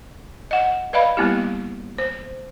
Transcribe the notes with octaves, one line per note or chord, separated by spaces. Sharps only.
D#5 F#5
B4 D5 D#5 F5 B5
G3 A#3 B3 E4 G4
C5